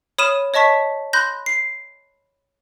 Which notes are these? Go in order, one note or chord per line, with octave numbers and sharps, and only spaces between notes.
C#5 B5 D#6 F6 D#7 E7
C#5 D#5 A5 C#6 B6
B5 C6 F#6 G6 A#6
C7